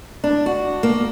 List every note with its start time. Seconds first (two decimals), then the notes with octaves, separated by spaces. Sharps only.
0.24 D4
0.46 F#4
0.83 A#3